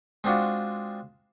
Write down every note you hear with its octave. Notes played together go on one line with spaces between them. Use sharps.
G#3 C4 D4 F4 F#4